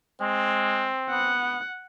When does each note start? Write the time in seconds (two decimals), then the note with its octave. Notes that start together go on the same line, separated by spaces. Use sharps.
0.20 G#3 C4
1.10 B3 F#5